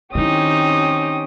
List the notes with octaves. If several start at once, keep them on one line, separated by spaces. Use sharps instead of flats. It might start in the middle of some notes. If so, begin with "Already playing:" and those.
D#3 C4 C#4 D#4 E4 G4 D#6